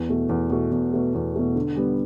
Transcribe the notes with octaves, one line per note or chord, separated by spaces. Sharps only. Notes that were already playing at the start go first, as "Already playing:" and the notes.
Already playing: E2
B2 A3
E2
B2 A3
E2
B2 A3
E2
B2 A3
D3
G3 B3